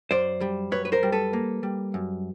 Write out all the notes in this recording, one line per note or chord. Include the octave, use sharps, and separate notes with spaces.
F#2 C5 D5
G3
F#2 B4 C#5
B4
A#4 C5
G3
A4 B4
A#3
G3
F#2